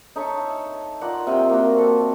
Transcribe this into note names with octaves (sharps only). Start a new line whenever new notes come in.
D#4 A4 C#5 E5
F4 A#4 D5 F#5
C3 F4 G5
A#3 F#4
C4 A4